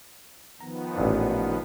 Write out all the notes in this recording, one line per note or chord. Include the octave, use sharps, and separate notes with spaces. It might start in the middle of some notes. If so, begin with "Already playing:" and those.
D#3 F3 B3 A#5
A1 A#2 D4